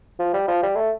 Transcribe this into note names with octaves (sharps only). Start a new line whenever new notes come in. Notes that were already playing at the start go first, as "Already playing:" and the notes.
F3
G3
F3
G3
A3